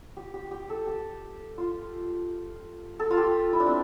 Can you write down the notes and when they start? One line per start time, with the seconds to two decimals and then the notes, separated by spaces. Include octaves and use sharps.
0.17 G4
0.34 G4
0.51 G4
0.70 A4
0.87 G4
1.58 F4
3.00 A4
3.11 F4
3.17 G4
3.53 E4
3.60 D4
3.66 C4